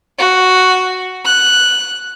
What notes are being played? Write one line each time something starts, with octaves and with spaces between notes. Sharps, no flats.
F#4
F#6